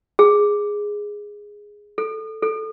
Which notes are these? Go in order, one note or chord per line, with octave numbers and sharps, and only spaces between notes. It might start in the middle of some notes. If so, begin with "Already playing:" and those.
G#4
A4
A4